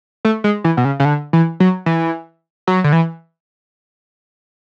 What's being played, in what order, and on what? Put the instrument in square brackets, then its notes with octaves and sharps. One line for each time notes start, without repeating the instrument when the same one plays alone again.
[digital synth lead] A3
G#3
E3
B2
C#3
C#3
D3
E3
F#3
E3
F#3
D3
E3